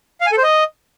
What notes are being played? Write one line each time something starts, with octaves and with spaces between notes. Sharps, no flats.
F5
G#5
A4
C5
D#5